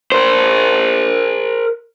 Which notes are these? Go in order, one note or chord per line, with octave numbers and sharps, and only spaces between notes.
A#4 C5